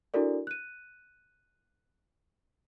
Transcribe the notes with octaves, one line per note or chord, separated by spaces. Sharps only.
D4 E4 F#4 A4 A#4 D5
F#6 D#7